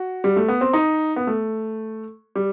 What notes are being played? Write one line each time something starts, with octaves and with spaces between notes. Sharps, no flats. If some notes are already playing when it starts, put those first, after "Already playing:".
Already playing: F#4
G3
A3
B3
C4
D#4
B3
A3
G3